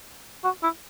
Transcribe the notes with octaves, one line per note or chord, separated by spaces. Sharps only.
F#4
E4